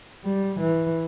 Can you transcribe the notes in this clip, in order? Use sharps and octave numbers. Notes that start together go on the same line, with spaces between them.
G3
E3